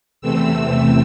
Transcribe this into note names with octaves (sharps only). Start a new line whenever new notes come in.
E2 C3 E3 A3 C4 E6